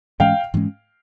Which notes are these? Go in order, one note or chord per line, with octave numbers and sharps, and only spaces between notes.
G#2 E3 G#3 C#4 F5 G5
G#2 E3 G#3 C#4